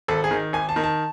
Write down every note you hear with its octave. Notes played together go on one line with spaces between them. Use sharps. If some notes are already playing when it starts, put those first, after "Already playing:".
G#1 A4
G#4
D#3
G#1 G#5
A5
D#3
A5